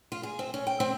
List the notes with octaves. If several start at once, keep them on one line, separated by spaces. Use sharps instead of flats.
F4
G#4
C4
C#4
G5
C4